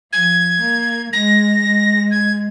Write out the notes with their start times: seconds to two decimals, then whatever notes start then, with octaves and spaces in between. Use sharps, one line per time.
0.13 F3 G#6
0.62 A#3
1.13 G#3 A#6
1.62 G#3
2.11 G#6